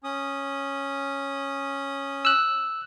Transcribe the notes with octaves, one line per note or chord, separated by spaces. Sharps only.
C#4 D#6
E6 F#6